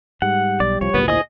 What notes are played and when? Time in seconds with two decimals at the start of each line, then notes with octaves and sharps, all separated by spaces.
0.22 G#2 G3 G4 F#5
0.60 B1 D5
0.81 C2 F3 C#5
0.94 G#1 D2 A#2 B3
1.08 E4 G#4 C5 D#5 D#6